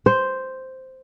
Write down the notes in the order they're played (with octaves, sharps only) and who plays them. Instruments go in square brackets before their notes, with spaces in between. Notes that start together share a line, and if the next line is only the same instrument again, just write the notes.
[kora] C5